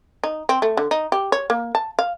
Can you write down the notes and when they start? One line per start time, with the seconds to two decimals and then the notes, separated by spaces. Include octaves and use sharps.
0.24 D#4
0.49 C4
0.62 A3
0.77 D3
0.91 D#4
1.12 G4
1.32 C#5
1.50 A#3
1.75 A5
1.99 F5